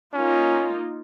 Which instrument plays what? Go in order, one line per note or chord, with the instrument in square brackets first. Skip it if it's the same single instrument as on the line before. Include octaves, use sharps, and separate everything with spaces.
[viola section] A#3 D#4 F4 [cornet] C#4